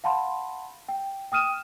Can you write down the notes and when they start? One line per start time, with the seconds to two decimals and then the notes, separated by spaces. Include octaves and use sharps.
0.04 F5 F#5 A5 B5 C6
0.89 G5
1.32 G5 D#6 F6 D#7 E7